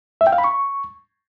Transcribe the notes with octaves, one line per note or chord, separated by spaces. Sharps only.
E5
G5
F5
B5
C#6